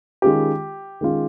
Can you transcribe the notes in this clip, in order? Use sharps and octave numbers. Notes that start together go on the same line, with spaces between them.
D#3 G#3 C#4 F4 G4
D#3 G#3 C#4 F4